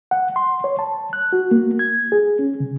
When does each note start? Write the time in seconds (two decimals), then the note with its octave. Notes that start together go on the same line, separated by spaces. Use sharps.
0.11 F#5
0.36 C6
0.64 C#5
0.79 A5
1.13 F#6
1.33 F#4
1.51 A#3
1.79 G#6
2.12 G#4
2.39 C#4
2.60 C#3